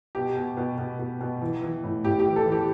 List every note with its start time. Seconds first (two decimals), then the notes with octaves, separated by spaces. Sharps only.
0.15 B2 G4
0.36 B2
0.57 B2
0.78 B2
0.99 B2
1.21 B2
1.41 E3
1.62 E3
1.83 A2
2.04 A2 G4
2.19 G4
2.26 E3
2.36 A4
2.46 E3
2.52 G4